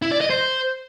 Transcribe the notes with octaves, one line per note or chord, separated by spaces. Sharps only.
E4
D5
D#5
C5